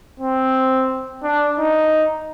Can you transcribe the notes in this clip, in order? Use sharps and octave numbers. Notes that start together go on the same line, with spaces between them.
C4
D4
D#4